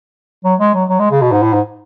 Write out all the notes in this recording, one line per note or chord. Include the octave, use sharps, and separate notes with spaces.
F#3
G#3
F#3
F#3
G#3
C#3
B2
G#2
A2
G#2